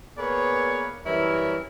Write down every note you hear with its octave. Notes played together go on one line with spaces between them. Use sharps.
A#3 B3 G#4 B4 C#5 D5
F#2 E3 G3 E4 A#4 C#5